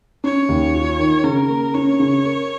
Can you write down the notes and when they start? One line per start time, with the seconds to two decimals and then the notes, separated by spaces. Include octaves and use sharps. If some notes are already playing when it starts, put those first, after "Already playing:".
0.24 C#4 C#5
0.49 D#2
0.74 F4
0.99 D#3
1.24 C#3 A#4
1.49 A#3
1.74 C#4 C#5
1.99 C#3
2.25 A#4